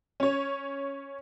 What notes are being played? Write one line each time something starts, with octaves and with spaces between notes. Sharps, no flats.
C#4 C#5